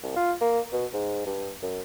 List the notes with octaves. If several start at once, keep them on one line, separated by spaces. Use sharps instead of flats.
C2
F4
A#3
B2
G#2
G2
F#2